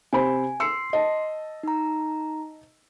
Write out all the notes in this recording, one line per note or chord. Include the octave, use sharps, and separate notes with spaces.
C3 C5 G#5 B5
C6 E6 C7 C#7
D#5 A5
D#4 A#5